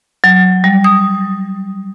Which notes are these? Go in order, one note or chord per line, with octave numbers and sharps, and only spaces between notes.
F#3
G3
D#6